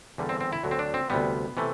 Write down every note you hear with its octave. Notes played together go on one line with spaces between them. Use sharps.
E2 D3 G3
C4
C4
E4
D2 D3 F#3
C4
D4
C4
D2 C3 G3 B3
C3 E3 A3